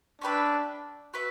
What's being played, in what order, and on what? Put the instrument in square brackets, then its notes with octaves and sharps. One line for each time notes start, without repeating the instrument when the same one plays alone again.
[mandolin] C#4 G4 B4 E5 [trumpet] D4
[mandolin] F#4 B4 E5